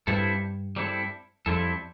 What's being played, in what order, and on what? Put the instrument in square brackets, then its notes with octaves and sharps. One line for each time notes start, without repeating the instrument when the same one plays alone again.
[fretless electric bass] G2 [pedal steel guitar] G3 C4 E4 A4
[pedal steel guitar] G3 C4 E4 A4
[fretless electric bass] F2 [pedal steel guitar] G3 C4 E4 A4